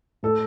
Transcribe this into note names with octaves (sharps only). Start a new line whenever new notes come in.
A2 A4